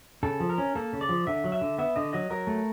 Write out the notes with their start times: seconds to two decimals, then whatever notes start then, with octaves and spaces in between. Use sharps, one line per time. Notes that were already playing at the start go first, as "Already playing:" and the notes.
0.23 C#3 A4
0.40 F3
0.50 A#4
0.58 C#4
0.75 A#3 A4
0.93 C#3
1.01 D5
1.09 F3
1.27 D3 E5
1.44 F#3
1.52 E5
1.61 D3
1.78 B3 E5
1.96 D3 D#5
2.13 F#3 D#5
2.30 F#3 A#4
2.47 A3